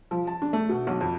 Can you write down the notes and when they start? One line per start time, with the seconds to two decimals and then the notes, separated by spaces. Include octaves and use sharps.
0.11 F3
0.27 A5
0.42 D4
0.53 A3
0.69 B2
0.87 B1
1.01 F2